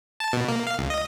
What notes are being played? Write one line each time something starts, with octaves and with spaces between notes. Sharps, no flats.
A5
B2
A#3
F5
C#2
D#5